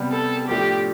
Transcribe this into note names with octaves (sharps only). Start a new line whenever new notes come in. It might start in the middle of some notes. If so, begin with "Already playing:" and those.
Already playing: C3 G3 B3
A4
A2 F3 A3 D4 G4